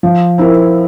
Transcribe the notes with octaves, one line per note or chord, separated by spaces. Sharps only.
F3
C4 E4 A#4